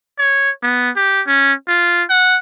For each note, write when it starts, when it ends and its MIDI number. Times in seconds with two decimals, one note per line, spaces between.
0.19 0.50 73
0.63 0.90 59
0.96 1.21 67
1.27 1.53 61
1.68 2.03 65
2.10 2.38 78